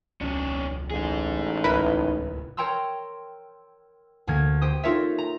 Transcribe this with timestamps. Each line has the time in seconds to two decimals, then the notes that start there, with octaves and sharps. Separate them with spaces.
0.21 E1 C#2 F#3 C#4 D4
0.91 A1 D#4 G#4
1.64 D1 C2 G#2 E4 A#4 B4
2.57 A#4 C#5 G5 A#5 C6 E6
4.27 D2 D3 A#3 F6 G#6
4.61 G4 C5 D#6
4.83 D#4 F4 A4 A#4 C#5 E5
5.18 A#5